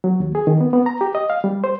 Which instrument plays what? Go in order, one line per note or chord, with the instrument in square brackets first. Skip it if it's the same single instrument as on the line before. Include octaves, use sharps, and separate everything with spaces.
[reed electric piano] F#3
D#2
G#4
D#3
B3
B3
A#5
G4
D#5
F5
G3
C5